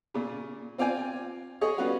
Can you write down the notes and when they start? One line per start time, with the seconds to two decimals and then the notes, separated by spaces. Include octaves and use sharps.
0.14 A#2 C#3
0.78 C4 F4 D5 G5 G#5
1.61 G#4 C#5 D#5
1.78 G3 B3 C#4 F4 F#4